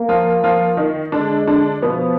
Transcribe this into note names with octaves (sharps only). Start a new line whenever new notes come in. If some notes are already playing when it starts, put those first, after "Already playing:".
Already playing: A#3
F3 F4
F3 F4
D#3 D#4
D3 G#3 D4
D3 D4
B2 F3 B3